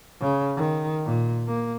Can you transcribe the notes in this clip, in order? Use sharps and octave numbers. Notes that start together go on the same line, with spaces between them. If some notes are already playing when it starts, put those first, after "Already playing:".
C#3
D#3
A#2
A#3